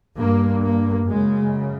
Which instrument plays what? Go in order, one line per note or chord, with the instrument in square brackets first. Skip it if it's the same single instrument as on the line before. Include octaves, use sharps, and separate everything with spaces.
[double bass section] G2 A#3
A#3
F#2 C#3 G#3